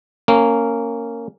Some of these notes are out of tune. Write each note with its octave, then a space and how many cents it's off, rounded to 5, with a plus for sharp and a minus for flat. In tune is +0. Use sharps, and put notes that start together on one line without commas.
A#3 -15 C#4 +0